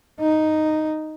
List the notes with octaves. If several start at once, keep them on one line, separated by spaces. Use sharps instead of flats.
D#4